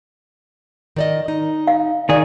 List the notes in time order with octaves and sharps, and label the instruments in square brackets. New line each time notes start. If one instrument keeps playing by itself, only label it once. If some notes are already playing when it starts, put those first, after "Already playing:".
[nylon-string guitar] D#3 D5 D#5
D#4
[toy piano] F5
[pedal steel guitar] D#3 G#4 [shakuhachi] D5